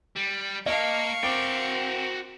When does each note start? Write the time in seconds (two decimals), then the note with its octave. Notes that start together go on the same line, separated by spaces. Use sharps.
0.16 G3
0.66 A#3 D#5 F5 A5 C#6
1.23 C4 F#4 A#4 G5 D6 A6